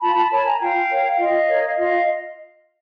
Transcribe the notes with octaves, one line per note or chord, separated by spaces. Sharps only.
F4 A5 B5
A5 B5
A#4 C#5 A5 B5
G#5 A#5
F4 F5 G5
A#4 C#5
F4 D#5 F5
A#4 C#5
F4 D#5 F5